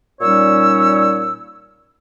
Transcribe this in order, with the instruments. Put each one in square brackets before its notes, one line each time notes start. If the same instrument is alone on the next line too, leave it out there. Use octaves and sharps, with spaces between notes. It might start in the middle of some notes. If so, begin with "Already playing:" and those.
[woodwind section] A#2 G3 C#4 D#4 C#5 E6